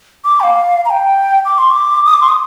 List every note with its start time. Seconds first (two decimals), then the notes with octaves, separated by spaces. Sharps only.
0.25 D6
0.40 G5
0.43 F5
0.85 A#5
0.90 G5
1.45 D6
1.58 C6
1.71 D6
2.06 D#6
2.13 D6
2.21 C6
2.28 D#6